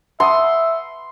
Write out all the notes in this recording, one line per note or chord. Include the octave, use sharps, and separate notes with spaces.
E5 F#5 A5 C6 D#6